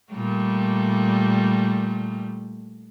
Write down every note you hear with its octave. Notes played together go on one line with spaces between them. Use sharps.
A#2 G3 A3